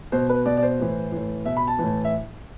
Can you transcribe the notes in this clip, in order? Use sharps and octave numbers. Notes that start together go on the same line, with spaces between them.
B2 C5
B4
B2 D5
D5
C5
A2 E3
A2 E3
B2 E5
B5
A5
A2 E3
E5